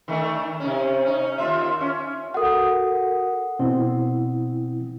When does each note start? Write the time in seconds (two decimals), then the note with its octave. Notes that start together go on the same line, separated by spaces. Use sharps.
0.08 D#3 A3 D4
0.60 C3 C#4
1.05 C#4 D#4
1.38 D#2 F4 E5
1.81 C#4
2.34 F#4 A4 A#4 F#5 D#6
3.59 B2 C4 E4